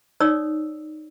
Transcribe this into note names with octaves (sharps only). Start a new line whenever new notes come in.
D#4 C#5 D5 D#6 E6